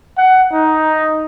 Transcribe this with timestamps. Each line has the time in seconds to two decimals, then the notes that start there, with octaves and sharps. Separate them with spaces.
0.18 F#5
0.52 D#4